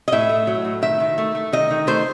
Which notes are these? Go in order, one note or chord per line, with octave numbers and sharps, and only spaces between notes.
D#5
A2 E5
A3
F#3
A2
D#3 E5
D#3
A3
A3
D#3 D#5
D#3
A3 C5